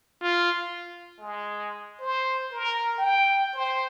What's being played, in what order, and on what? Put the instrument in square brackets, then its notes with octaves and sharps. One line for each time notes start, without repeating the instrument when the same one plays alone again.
[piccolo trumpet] F4
[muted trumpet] G#3
C5
A#4
G5
C5